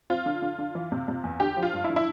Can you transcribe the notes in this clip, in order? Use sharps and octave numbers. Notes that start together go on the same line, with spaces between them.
C4 F4
D3
D3
D3
E3
C3
C3
E2
D3 G4
F3
F4
G2
E4
D3
E4